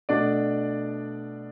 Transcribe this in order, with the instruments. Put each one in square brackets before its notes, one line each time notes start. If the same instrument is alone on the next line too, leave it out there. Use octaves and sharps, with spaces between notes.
[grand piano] B2 A3 D4 D5